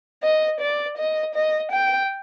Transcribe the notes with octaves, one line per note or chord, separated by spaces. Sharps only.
D#5
D5
D#5
D#5
G5